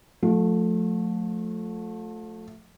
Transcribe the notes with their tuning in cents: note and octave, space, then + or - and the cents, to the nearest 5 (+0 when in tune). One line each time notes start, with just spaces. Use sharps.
F3 +40 A3 +0